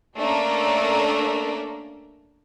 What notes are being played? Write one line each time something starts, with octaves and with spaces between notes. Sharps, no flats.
A3 A#3 C#4 D4 A4 A#4